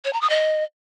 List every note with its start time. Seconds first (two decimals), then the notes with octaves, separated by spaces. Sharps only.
0.05 C#5
0.13 A#5
0.21 D#6
0.30 D#5